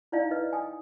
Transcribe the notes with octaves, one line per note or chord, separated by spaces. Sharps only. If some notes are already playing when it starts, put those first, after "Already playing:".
D#4 E4 D5 D#5 F5
B4 D#5
G#5 D#6